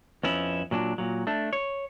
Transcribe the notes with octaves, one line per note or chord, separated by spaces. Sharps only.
F2 B3 C#4 E4
A#2 F#3 D4
A#2 F#3
A3 D4
C#5